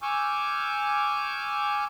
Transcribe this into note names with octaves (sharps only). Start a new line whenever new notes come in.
G#5 C#6 D6 E6 F6 G6